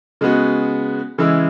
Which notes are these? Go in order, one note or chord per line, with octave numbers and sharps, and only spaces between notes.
C#3 G#3 B3 F#4
C#3 E3 G#3 E4